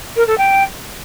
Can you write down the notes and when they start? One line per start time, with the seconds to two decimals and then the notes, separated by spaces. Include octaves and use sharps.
0.16 A#4
0.27 A4
0.38 G5